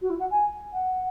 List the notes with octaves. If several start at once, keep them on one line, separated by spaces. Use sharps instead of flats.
F#4
E4
F#5
G#5
F#5